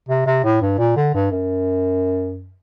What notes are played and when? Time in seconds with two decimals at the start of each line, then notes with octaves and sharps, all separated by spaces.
0.09 C3
0.26 C3
0.44 A2
0.62 G2
0.78 A#2
0.96 D3
1.14 G2
1.31 F#2